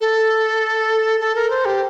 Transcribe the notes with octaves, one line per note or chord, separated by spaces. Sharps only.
A4
A4
A#4
C5
G4